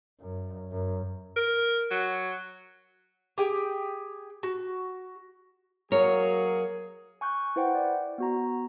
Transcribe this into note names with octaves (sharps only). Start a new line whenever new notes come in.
F#2
F#2
A#4
F#3
G4 G#4 G5
F#4
F#3 A#3 F#4 G#4 A#4 C#5
G#5 C#6 F#6 G6
E4 B4 C5 F#5 G5
D5
B3 F#4 A#5